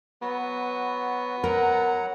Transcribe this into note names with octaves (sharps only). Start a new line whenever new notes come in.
F#3 B3 F#4
F#3 A#4 F#5 A#5